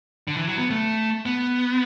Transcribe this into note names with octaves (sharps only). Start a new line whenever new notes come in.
D3
E3
F#3
B3
A3
B3